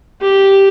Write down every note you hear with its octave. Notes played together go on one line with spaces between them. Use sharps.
G4